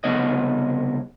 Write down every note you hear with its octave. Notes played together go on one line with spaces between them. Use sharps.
C2 C#3 B3 C#5 D#5